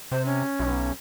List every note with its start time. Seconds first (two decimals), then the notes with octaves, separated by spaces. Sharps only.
0.12 C3 C5
0.26 C#4
0.60 B1